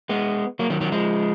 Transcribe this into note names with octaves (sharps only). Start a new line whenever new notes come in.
G#3 B3
F#3 A#3
D#3 F#3
D#3 F#3
F3 G#3